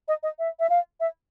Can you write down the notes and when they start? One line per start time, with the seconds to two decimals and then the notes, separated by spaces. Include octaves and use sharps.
0.08 D#5
0.23 D#5
0.39 E5
0.60 E5
0.70 F5
1.00 E5